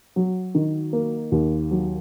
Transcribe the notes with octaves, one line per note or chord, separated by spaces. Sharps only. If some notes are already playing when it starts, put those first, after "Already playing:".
F#3
D#3
A#3
D#2
F#3